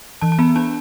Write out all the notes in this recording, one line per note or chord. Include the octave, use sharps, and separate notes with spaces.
E3 A5
A5
B3 B5
D4 A5